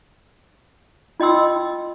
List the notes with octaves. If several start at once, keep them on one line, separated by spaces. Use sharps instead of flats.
F4 D#5 G5 C6 E6